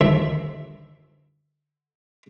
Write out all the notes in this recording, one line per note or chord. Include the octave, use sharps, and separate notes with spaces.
D2 G2 D3 D#3 F3 E5